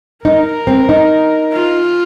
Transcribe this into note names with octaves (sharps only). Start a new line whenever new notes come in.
D#4 A#4
C4
D#4
F4